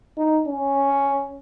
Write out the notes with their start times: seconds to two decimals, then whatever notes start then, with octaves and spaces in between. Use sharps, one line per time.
0.17 D#4
0.48 C#4